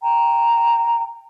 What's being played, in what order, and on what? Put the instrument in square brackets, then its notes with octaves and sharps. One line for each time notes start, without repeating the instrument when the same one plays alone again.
[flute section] G5 A#5